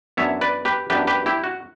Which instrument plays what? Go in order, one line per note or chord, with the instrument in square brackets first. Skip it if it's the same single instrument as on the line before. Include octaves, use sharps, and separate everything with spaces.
[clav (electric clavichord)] F#2 E3 B3 D4 C#5 E5
B4 D5
G4 B4
F#2 E3 B3 D4 G4 B4
G4 B4
E4 G4
F#4